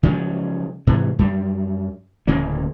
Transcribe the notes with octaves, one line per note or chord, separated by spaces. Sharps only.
C#3 F3 F#3 G#3
G#2 C3 E3
F#2 G3
D1 C#3 A#3 C#4